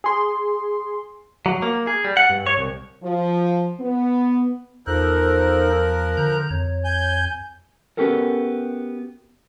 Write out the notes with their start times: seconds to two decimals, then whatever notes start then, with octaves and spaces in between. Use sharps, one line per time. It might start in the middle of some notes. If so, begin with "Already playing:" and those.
0.04 G#4 C6
1.46 F#3
1.62 A#3
1.87 G#4
2.04 G3
2.17 F#5
2.30 G2
2.47 C#5
2.58 C2
3.03 F3
3.80 B3
4.87 E2 F3 D#4 A4 A#4 C5 F#6
6.17 D3 A#5 G6
6.50 F2 C#5
6.84 G#5 G6
7.97 B3 C#4 F#4 G4 A4 A#4